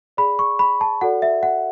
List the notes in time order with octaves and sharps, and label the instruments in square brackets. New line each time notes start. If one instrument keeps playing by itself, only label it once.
[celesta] G#4 D5 B5
C#6
B5
A5
F#4 A4 D5 F#5
E5
F#5